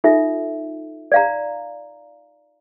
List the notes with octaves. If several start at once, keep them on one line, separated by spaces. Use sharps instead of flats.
D#4 F4 A4 E5
D5 F5 A#5